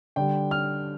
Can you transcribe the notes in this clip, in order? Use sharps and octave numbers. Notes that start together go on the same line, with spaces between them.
D3 G3 G5
F6